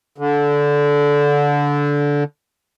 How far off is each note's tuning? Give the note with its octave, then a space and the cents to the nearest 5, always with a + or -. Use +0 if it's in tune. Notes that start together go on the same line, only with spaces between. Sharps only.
D3 -20